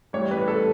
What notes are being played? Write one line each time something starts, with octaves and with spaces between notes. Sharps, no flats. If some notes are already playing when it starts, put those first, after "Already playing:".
A1 A2 G3 C#5
B4
A4